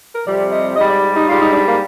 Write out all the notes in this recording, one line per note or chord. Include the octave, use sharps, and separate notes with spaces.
A#4
F2 C3 G3 D5
D#5
G#2 G3 D#5
D5
G4
D#4
G#2 G3 F4
D#4
D4
A#3